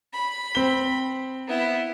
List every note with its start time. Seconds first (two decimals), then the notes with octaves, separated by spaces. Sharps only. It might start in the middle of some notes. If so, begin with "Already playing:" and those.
0.13 B5
0.55 C4 G7
1.48 B3 E4